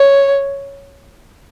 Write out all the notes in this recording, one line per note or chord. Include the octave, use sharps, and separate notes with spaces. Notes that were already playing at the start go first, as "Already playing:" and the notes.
Already playing: C#5